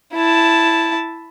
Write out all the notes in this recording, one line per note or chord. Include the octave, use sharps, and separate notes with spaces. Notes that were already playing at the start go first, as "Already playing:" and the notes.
E4 A5